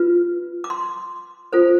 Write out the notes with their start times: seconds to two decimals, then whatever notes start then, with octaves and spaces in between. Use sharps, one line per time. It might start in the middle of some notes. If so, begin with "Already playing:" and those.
Already playing: F4 B4
0.64 D6
0.70 C6
1.53 F4 A4 C5